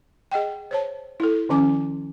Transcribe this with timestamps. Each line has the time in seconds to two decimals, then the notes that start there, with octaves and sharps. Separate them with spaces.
0.31 G#4 D#5 F#5 G5
0.71 C5 C#5 A5
1.20 E4 A4
1.49 D#3 F3 C#4 G#5 D6